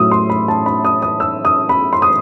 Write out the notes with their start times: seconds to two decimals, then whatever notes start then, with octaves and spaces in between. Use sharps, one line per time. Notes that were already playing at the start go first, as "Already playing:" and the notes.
Already playing: A2 F#3 D#6 E6
0.11 C6
0.30 B5
0.48 A5
0.66 B5
0.85 D#6
1.02 D#6
1.20 E6
1.45 D#6
1.69 B5
1.93 C6
2.02 D#6